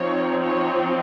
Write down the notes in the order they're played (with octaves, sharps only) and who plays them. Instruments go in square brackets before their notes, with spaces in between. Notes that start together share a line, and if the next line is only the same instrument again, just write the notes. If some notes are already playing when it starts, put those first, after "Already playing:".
Already playing: [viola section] F3 C4 D#4 C#5
C#5